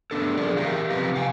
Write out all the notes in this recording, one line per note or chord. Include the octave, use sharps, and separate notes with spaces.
A3 B3 D4 A4
F3 G#4 A#4 D5
E4 F4 G4 A#4 E5 F5
C3 F3 C4 G4 B4 A#5
F5 G5 G#5